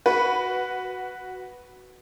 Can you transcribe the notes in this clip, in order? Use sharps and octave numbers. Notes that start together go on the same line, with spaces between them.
F#4 B4